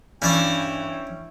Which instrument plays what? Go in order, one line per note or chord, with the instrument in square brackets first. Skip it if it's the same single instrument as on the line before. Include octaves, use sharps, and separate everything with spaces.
[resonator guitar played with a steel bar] G2 [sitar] E3 [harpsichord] C#4 D5 A5 [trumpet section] C#5 G5